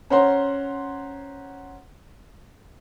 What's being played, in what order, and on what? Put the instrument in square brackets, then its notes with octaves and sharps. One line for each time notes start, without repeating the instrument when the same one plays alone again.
[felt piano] C#4 C5 C#5 F#5 A#5 C6